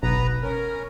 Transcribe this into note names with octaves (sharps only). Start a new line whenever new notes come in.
F#1 B1 B3 B4 A#5
C#4 A#4